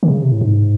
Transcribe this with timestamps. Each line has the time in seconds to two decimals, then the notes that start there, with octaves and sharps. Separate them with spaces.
0.03 D#3
0.08 C3
0.12 C#3
0.23 C3
0.32 A2
0.41 G#2